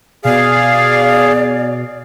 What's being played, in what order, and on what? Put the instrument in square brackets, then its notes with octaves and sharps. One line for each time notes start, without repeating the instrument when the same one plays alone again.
[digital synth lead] B2 [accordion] G#4 F5 [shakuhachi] D5